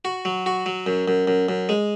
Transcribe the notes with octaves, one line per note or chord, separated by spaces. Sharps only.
F#4
F#3
F#4
F#3
F#2
F#2
F#2
F#2
G#3